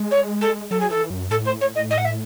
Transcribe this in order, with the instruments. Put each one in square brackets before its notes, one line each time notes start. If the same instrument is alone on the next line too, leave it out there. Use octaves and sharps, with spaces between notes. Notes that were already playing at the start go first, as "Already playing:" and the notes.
Already playing: [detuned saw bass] G#3
[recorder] C#5
A4
[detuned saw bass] F#3 [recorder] A4
[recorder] G#4
[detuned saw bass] E3 [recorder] A4
[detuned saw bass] F#2
[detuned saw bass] A2 [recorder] A4
[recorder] C5
C#5
D#5
D#5
F#5
E5